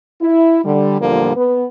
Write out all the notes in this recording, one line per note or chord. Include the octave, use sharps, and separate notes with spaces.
E4
D3 G3
E2 A#2 D3 F3 G3 A#3
B3